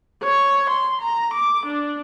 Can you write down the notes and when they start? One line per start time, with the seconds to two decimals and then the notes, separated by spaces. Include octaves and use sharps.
0.24 C#5
0.70 C6
1.02 A#5
1.34 D6
1.66 D4